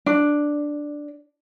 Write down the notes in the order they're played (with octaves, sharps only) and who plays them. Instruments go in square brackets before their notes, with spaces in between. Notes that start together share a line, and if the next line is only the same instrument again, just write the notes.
[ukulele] D4